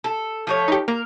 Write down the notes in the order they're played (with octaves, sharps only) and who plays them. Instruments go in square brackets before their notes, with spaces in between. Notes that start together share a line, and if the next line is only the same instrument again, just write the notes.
[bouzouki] A4
F3 A3 C#5
[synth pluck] D#4 G4
[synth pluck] A#3 [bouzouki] A#4